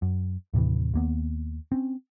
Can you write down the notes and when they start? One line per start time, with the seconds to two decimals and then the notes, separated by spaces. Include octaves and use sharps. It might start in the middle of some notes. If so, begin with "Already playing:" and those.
0.02 F#2
0.53 D#2 A2 C3 E3
0.94 D#2 A#3 B3
1.72 C4 C#4